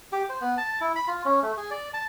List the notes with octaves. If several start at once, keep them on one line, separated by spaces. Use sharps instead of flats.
G4
C5
B3
A5
E4
B5
F4
C#4
A3
G#4
D5
A5